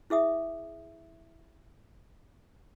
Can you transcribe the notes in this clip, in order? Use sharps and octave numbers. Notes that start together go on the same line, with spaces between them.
E4 G#4 E5 D#6